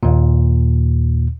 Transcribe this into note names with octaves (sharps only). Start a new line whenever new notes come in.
D#2 A#2